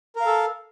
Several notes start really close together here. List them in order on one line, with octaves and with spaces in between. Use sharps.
A#4 F5 A4